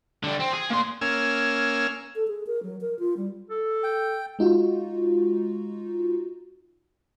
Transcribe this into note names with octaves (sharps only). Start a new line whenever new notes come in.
D3 G3
C4
G#4
A#3 C6
A#3 C#4 G#5 E6 F6
A4
G#4
A#4
F#3
A#4
F4
G3
A4
G5
G#3 D#4 F4 F#4